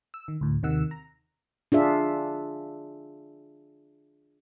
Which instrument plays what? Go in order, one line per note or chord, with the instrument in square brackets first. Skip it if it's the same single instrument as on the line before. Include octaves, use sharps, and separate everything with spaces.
[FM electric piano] E6
D#3
D2 A2
D#2 C3 D#3 F#5 E6
A#5
[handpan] D4 F4 G#4 E5